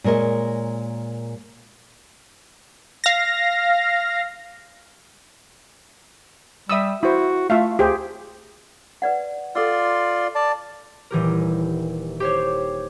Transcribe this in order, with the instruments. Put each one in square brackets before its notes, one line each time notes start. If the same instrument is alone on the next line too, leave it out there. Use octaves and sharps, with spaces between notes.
[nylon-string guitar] A#2 G#3 A#4 C#5 D#5
[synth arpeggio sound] F5 A#6
[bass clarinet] G3 [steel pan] E5 D#6 E6
[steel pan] E4 C5 [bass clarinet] F#4
[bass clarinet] A3 [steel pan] F4 E5 F5
[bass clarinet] D2 [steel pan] G4 G#4 C5
[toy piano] B4 D5 F#5
[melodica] F4 D5 C6 [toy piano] A4 E6
[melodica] D5 A5
[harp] D#1 E3 G4 A#4
G4 C5 C#5